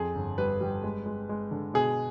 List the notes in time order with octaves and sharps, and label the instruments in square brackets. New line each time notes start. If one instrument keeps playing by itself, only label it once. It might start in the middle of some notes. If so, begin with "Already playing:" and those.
Already playing: [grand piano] F2 G#4
G1
G3 B4
G3
G#3
G#3
G#3
D3
B2 G#4